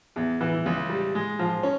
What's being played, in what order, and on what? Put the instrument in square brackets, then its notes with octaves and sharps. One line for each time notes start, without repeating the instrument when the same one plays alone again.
[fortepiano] E2
E3
C#2
G3
G#3
F3
C#4